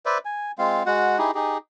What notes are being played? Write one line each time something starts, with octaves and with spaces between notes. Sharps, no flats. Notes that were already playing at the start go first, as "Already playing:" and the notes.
B4 C5 D5 E5
G#5
G#3 C4 F4 F5
G#3 F#4 F#5
D#4 E4 G4 G#4
D#4 G4 G#4